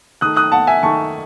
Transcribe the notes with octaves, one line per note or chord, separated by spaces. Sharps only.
D#3 A3 D#6 F#6
D#6 F#6
F#5 A5
E5 G#5
D#3 A3 A5 C#6